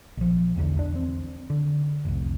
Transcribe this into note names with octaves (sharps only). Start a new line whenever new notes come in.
A#1 F3
E1 B1 E2 D3
D4
C4
D3
F1 C2